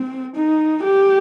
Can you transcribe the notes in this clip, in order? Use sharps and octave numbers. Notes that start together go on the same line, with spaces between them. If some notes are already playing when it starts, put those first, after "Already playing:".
Already playing: C4
D#4
G4